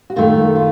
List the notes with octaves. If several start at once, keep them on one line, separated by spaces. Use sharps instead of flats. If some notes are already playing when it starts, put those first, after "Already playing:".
F#4
F#2 D#3 A3 F4
F4